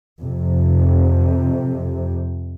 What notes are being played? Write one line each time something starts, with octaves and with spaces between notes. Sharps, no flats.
F2 C3